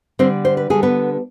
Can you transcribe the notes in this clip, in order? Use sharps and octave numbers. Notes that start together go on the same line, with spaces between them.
D3 G3 C4 C5
C5
B4
D3 G3 G#4
B3 B4